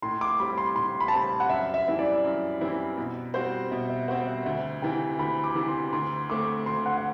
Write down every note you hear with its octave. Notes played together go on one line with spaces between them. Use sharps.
A2 C6
D6
G3 C4 B5
C6
A2 C6
B5
A5
G3 C4 B5
F#5
F#2 E5
E5
E3 G3 C4 E4
D5
F#2
E3 G3 C4 E4
B2
G3 C4 F#4 C5
B2 E5
E5
G3 C4 F#4 C5 F#5
E5
D2 E5
C3 E3 G5
D2 B5
D6
C3 E3
C6
D2 C6
D3 A3 C4 D6
D2 C6
F#5
F#5